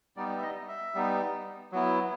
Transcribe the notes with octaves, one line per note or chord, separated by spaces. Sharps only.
G3 B3 D#4 D5
E5
D#5
E5
G3 B3 D#4
F#3 B3 E4